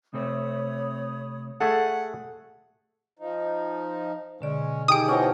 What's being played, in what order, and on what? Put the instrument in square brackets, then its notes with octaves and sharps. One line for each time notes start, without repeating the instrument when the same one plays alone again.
[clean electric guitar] C3 A3 C4 [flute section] C#5 B5 D#6
[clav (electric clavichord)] A3 G#4 A4 [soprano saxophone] F#5
[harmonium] F3 D#4
[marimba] B2 D3 D5 [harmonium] G#3 C#4
[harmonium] D#3 [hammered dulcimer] D#4 G4 G#4 [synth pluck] D#6 D7
[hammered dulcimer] F3 B3 C#4 [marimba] E4 [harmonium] G#4 C#5 D#5